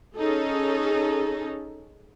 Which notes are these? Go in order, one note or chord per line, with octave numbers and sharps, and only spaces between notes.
C#4 D#4 G#4 A4